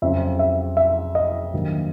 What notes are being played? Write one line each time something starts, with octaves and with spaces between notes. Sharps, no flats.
F2 C#3 F#3 E5
E5
E5
D#5
G2 D#3 F#3 A#3